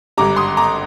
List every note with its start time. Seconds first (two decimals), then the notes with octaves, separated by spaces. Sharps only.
0.17 G#1 G2 D3 G3 A#5 D6
0.36 C6 D#6
0.57 A#5 D6